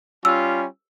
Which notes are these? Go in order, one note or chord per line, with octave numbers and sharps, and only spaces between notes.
G3 C#4 F4 E6